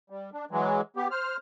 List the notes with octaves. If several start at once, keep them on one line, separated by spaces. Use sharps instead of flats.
G3
D4
E3 F#3 G#3
B3 G4
C5 F6